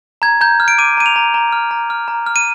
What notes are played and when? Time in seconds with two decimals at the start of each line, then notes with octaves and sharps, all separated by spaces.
0.22 A#5 G#6
0.41 A#5 G6
0.60 F6
0.68 D7
0.78 D6 D#7
0.97 A#5 D#7
1.06 F7
1.16 A#5
1.34 A#5
1.52 F6
1.71 A#5
1.90 F6
2.08 A#5
2.26 F6
2.36 D#7